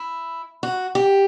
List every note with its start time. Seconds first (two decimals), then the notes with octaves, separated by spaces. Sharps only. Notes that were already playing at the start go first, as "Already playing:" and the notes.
Already playing: E4
0.63 F#4
0.95 G4